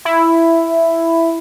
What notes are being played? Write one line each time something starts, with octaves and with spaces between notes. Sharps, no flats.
E4